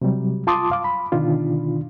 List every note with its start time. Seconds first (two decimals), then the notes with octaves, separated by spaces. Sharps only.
0.02 C3 F#3 G3
0.47 F4 A5 C6 D6 D#6
0.71 F5 D6
0.84 B5
1.12 B2 D3 D#3 D4 F4